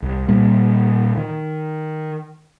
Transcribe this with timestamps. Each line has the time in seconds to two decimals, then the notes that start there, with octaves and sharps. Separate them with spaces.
0.02 C2
0.28 A#2 G3
1.17 D#3